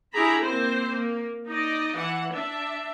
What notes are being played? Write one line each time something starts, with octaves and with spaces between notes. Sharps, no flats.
D4 E4 G4 G#4 A#5 B5
A#3 C4 C5
A#3
D#4 D5 D#5
E3 F#5
D4 E5